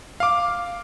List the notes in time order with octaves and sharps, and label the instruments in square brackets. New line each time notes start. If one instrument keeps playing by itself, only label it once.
[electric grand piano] F5 D6